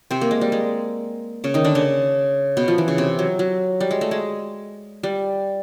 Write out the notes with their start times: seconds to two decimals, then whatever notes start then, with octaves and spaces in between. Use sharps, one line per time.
0.11 C3 C4
0.21 A#3
0.31 G#3
0.41 G3
0.52 G#3
1.44 C#3 C#4
1.54 D#3 D#4
1.64 D3 D4
1.75 C#3 C#4
2.57 B2 B3
2.68 F3
2.78 E3
2.88 C#3
2.98 C3
3.19 F#3
3.39 F#3
3.80 G3
3.91 G#3
4.01 A3
4.11 G#3
5.03 G3